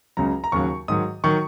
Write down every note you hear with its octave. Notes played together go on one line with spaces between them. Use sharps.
C#2 C#3 F#3 A#5
A#5
D#2 C#3 F#3 C#6
G#2 D#3 F#3 D#6
D#3 F#3 C#6